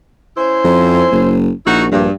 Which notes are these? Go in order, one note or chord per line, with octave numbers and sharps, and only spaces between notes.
C#4 E4 C5
F2
F#1
A#1 D#4 E4 F#4
A#1 G2